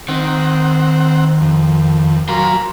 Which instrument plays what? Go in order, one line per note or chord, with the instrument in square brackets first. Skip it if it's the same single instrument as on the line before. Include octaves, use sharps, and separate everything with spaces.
[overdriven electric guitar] D#3 [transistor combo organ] C4 F#5
[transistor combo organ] F2
[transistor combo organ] F#3 A#4 F5 [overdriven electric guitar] A#5 C6